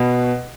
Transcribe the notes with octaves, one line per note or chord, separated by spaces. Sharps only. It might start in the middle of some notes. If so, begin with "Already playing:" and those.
Already playing: B2